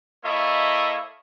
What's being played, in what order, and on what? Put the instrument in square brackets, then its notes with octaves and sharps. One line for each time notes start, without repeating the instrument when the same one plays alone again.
[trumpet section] A#3 E4 A4 C#5 D#5 E5